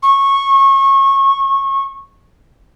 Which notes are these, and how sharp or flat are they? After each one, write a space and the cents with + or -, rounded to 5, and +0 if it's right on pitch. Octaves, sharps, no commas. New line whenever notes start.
C#6 -15